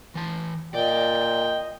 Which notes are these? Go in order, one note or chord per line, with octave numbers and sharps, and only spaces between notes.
E3 A5
A#2 D5 D#5 G5